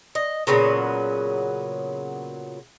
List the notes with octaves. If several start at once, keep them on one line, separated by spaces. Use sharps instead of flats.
D#5
A#2 C#3 F#3 B3